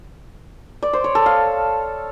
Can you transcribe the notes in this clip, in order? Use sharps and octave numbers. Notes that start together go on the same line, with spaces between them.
D5
C5
C#5
A4
F5